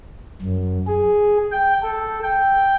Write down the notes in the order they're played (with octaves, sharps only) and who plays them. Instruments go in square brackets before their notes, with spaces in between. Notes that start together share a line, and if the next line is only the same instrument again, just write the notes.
[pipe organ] F#2
G#4
G5
A4
G5